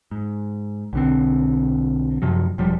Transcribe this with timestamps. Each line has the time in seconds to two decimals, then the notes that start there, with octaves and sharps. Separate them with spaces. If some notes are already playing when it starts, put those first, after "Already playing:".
0.11 G#2
0.93 B1 D3 C4
2.22 F#2 C3 F3 F#3
2.58 E1 F3 G3